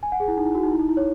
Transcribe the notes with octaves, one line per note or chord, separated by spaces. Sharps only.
G#5
F#5
G#4
E4
D#4
E4
F#4
D#4
E4
D#4
E4
C#5